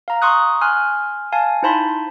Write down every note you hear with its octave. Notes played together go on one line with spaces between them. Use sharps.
F5 A#5
A#5 C6 C#6 D#6 F#6
G#5 C6 F6 F#6
F5 G#5 A5
D#4 E4 C5 A5 B5 C6